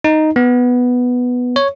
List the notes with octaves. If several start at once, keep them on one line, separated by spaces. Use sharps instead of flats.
D#4
B3
C#5